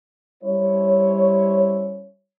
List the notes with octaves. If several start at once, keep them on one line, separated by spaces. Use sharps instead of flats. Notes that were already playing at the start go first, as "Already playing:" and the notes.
G3 C#4 E4 C5 C#5